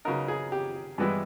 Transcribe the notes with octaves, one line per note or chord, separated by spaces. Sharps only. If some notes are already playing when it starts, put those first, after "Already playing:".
C#3 F#3 B3 D#4 A#4
G#4
G4
G2 E3 G#3 B3 E4